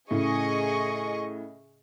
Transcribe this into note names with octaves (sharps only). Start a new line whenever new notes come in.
A2 C#3 G#4 D#5 C#6